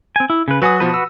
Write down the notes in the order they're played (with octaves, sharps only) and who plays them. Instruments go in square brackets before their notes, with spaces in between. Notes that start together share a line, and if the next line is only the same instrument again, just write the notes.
[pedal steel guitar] C4 G#5
E4
C#3 B4
[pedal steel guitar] F#3 F#4 [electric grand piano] B4 G#5 D#6
[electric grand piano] B2 F3 A5 [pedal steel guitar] F#4 B4
[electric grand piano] E6